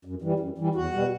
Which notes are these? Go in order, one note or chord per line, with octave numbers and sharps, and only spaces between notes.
F#2
E3 G3
F#2
E3 G3
E2 F#4
B2 G3